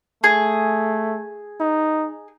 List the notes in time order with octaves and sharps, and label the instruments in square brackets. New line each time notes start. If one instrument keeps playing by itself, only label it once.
[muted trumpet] A3 [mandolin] G#4
[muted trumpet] D#4